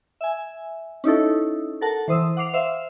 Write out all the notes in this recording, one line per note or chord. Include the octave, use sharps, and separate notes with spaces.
E5 G#5
C#4 D#4 E4 A4
A4 A#4 F#5 A5
E3 C5 D#6 E6
F#5 D6 C7 F7
C5 E5 F5